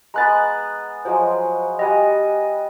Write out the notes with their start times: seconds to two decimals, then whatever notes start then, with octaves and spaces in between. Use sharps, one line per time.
0.14 G#3 B3 B4 A#5 F#6 A6
1.05 F3 F#3 G#3 C5
1.79 G3 D#5 F#5 G#5